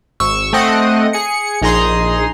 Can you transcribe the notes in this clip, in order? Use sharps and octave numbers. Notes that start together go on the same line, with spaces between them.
G#1 C#6 E6
A3 C4 D#5 F#5
G#4 C#7
A#1 D#4 G#4 A#5 C6